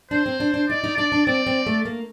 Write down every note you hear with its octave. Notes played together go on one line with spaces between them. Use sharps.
D4 C5
C4
D4
D4
D#4 D5
D#4
D4 D5
D4
C4 D5
C4
A3
A#3